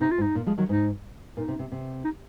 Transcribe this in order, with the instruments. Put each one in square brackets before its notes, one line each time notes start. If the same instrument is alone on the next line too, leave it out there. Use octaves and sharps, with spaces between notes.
[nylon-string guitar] C3 [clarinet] D#4
[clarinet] F4
[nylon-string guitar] G#2
[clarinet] D#4
[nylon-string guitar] A#2
F3 G#3
D#3 F#3
[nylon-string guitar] G#2 [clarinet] D#4
[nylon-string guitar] A#2 [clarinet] D#4
[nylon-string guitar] C3
C3
C3
[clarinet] D#4